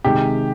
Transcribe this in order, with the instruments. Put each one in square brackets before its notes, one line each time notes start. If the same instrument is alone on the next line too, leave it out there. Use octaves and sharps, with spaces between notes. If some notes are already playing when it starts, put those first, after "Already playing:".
[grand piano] C3 D#3 G#3 [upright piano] G4